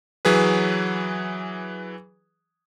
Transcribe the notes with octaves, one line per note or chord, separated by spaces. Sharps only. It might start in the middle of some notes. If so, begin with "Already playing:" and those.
E3 F#3 G#4 B4